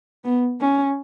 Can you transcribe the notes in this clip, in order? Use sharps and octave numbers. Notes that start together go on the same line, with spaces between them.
B3
C#4